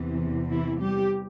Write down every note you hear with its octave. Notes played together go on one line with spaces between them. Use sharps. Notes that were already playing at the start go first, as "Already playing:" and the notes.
Already playing: E2 C3 E3
E3 E4
G3 G4